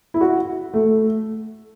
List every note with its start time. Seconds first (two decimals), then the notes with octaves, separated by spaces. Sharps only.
0.14 E4
0.21 F#4
0.74 A3